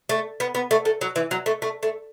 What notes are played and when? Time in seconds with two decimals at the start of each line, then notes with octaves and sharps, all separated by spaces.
0.09 A3
0.40 B3
0.55 B3
0.71 A3
0.85 A3
1.01 F#3
1.16 E3
1.31 F#3
1.46 A3
1.62 A3
1.83 A3